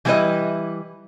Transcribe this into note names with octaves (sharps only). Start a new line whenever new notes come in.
E3 G3 E4 F#4 B4 D#5